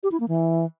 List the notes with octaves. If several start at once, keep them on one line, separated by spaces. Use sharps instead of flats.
G4
E4
A#3
E3